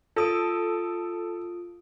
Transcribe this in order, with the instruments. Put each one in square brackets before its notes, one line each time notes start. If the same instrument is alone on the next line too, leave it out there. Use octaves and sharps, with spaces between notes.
[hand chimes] F4 D#6 D7 [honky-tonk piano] A4